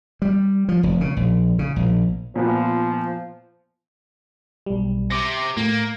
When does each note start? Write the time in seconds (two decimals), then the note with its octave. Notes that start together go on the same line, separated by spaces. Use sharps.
0.22 G3
0.69 F3
0.83 F1
1.01 C#3
1.17 A#1
1.59 C#3
1.76 A#1
2.36 A#2 F3 B3
4.66 B1 G3
5.10 C3 D6 A#6
5.57 A2 A#3